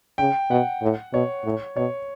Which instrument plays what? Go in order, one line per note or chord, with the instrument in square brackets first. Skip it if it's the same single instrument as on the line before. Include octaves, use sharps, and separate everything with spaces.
[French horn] C#3 [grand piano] G5
[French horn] B2 [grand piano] F#5
[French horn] A2
[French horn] B2 [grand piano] C#5
[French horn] A2
[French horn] B2 [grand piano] C#5